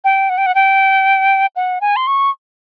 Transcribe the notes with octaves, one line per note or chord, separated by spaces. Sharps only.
G5
F#5
G5
F#5
G5
F#5
G#5
C6
C#6